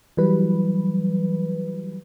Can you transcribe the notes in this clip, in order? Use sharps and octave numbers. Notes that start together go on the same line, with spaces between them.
E3 F#3 G3 B4